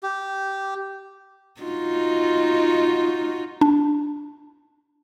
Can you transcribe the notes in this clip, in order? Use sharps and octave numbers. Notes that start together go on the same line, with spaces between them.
G4
D#4 F4 F#4
D4